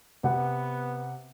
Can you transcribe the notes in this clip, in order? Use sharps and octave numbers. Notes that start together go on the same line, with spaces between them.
C3 B3 F#5